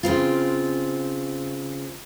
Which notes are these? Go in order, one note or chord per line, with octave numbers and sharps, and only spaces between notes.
C#3 C4 F4